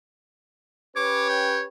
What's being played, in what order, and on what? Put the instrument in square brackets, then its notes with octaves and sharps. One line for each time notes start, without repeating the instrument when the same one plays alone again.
[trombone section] C#4 G4 B4 [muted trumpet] C#5 [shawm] D6
[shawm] G5